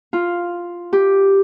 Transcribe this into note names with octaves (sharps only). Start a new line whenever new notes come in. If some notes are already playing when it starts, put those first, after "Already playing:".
F4
G4